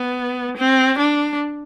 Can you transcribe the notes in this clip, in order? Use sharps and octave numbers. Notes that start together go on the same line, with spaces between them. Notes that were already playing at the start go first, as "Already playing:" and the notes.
Already playing: B3
C4
D4